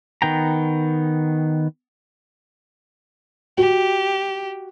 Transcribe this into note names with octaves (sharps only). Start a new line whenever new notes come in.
D#3 B3 G5 A#5
F#4 G4